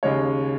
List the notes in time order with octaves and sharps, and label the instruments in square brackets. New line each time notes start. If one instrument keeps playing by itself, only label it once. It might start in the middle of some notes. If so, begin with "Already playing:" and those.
[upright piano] D#2 C#3 G#3 C#5